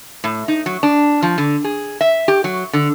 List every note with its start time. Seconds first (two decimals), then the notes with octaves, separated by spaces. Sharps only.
0.24 A2
0.48 D#4
0.66 F#3
0.83 D4
1.22 F3
1.38 D3
1.64 G#4
2.01 E5
2.28 G4
2.44 F#3
2.73 D3